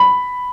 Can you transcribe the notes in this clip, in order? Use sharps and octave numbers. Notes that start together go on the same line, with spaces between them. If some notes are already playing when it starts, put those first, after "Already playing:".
Already playing: B5